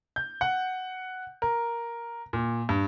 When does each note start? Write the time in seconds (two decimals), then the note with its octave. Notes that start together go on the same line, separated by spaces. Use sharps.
0.16 G6
0.41 F#5
1.42 A#4
2.33 A#2
2.69 G2